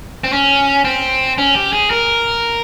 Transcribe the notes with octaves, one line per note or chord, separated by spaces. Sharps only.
C4
C#4
C4
C#4
G4
G#4
A#4